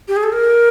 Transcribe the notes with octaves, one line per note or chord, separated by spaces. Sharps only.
G4
G#4
A4
A#4